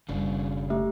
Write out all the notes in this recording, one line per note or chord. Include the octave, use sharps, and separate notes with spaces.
F#1 C#3 G3 D4
A3 G4 E5